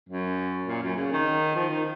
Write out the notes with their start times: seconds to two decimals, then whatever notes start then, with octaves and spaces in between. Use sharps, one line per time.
0.09 F#2
0.68 A#2
0.83 F#2
0.96 C#3
1.12 D#3
1.56 F3
1.70 D#3